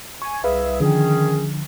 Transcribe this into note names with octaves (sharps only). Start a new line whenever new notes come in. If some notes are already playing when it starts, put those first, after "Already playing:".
G#5 C#6
C2 G#4 B4 E5 F5
D3 D#3 F3 C#4 G#4